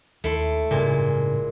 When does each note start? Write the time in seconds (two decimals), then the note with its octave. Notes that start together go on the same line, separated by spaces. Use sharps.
0.24 D#2 A3 E4 C6
0.71 A1 G2 A#2 C#3 G#3